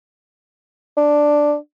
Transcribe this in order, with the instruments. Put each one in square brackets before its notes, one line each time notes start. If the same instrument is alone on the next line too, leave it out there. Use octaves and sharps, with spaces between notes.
[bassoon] D4